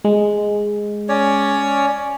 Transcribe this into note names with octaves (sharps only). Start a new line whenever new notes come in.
G#3
C#4 C#5 D5